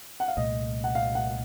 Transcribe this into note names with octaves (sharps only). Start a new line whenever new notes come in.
F#5
F5
C2 A#2 A3 D#5
F#5
F5
F#5